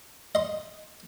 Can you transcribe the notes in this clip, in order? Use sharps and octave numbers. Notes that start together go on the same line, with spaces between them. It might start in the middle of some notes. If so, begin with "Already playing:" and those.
D#5 C6